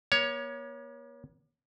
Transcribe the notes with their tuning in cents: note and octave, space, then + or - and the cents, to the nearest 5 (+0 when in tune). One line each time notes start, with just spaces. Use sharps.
A#3 +45 C#5 +10